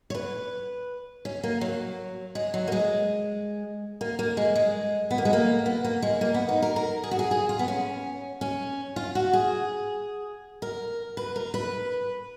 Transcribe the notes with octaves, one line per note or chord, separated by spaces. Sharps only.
C#5
B4
C#4
A#3
F#3
G#3
F#3
A#3
G#3
A#3
A#3
G#3
G#3
B3
A#3
G#3
A#3
B3
A#3
G#3
A#3
B3
D#4
A#4
A#4
G#4
F#4
G#4
G#4
F4
B3
C#4
C#4
F4
F#4
G#4
A#4
B4
A#4
B4